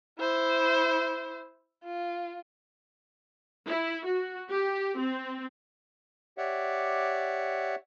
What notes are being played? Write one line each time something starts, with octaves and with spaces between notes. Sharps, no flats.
E4 C5
F4
E4
F#4
G4
C4
G4 C#5 D5 E5 F#5